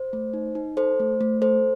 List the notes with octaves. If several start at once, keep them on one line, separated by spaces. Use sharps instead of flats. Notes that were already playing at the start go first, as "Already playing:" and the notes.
Already playing: C5
A3
D#4
D#4
A4 C5
A3
A3
A4 C5